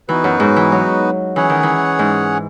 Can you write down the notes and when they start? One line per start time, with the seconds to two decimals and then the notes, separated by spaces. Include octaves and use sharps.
0.09 E3 B3 D#4 F#4 B4
0.24 F#2
0.40 G#2
0.56 E3
0.72 F#3
1.36 E3 C#4 G#4 C#5 F#5
1.49 D#3
1.63 E3
1.99 G#2